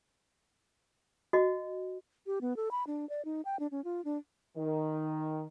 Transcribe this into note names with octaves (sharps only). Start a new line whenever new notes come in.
F#4 D#5
G4
B3
A4
B5
D4
D5
D#4
G5
D4
C#4
F4
D4
D#3